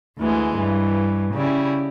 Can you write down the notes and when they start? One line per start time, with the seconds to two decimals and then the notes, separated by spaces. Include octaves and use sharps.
0.18 D2 E3 G#3
0.56 G2 E3
1.33 C#3 G3 E4